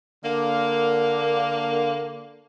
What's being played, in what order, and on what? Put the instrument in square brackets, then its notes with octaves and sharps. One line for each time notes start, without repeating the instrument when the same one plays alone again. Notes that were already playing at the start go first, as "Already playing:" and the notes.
[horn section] D3 A#3